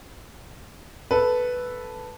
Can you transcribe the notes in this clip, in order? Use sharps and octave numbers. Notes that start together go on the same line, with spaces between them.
A4 B4